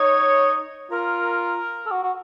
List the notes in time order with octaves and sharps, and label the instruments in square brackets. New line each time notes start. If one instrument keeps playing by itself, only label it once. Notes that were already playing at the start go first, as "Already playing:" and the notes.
Already playing: [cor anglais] D#4 [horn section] C#5
[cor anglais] F4 [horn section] A#4
[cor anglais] A4
F#4
F#4